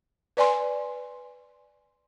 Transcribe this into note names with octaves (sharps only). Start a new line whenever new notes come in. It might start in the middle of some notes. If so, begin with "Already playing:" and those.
B4 D5 G#5 C6